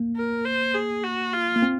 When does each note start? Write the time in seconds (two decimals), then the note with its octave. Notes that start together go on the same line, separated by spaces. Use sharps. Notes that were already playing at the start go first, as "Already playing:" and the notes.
Already playing: A#3
0.16 A#4
0.45 C5
0.74 G#4
1.04 F#4
1.33 F4
1.56 A#3
1.62 C4